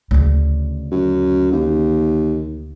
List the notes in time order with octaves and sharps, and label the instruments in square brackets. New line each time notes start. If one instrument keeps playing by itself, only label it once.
[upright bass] D2 C#3
[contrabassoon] F#2
D#2